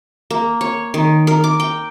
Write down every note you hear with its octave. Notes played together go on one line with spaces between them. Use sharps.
A#3
C#5
D#3
A#4
D6
G5